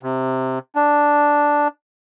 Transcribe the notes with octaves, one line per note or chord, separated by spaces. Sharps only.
C3
D4